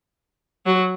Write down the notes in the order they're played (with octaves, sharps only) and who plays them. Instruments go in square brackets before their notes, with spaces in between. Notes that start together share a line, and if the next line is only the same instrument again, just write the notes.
[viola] F#3